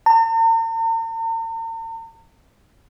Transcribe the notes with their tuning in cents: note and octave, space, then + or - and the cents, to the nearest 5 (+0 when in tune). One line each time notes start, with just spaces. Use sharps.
A#5 -45